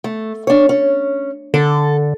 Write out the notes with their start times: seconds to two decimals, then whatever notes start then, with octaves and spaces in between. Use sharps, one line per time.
0.04 A3
0.47 D4 C#5
0.69 C#4
1.54 D3 A4